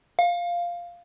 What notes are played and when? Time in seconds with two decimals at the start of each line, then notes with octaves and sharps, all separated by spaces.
0.19 F5